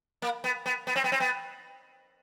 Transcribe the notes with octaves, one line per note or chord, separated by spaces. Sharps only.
A#3
B3
B3
B3
C4
B3
C4
B3